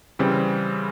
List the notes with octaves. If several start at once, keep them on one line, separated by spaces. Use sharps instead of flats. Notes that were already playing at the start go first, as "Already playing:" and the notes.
C#3 E3 G3 C4